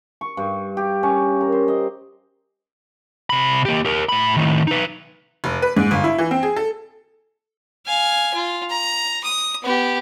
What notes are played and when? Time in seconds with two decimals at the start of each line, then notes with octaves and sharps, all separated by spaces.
0.21 C#6
0.37 G2
0.77 G4
1.03 C#4
1.41 A#4
1.52 C5
1.68 D#5
3.30 C3 B5
3.65 A#3 G4
3.85 G4 A#4
4.09 A2 B5
4.37 A2 D#3
4.67 D#4 B4
5.44 F1
5.62 B4
5.77 G#2
5.91 G1
6.04 E4
6.18 E3
6.31 C4
6.43 G#4
6.56 A4
7.86 F5 G#5
8.34 F4
8.70 A#5
9.24 D#6
9.62 B3 G4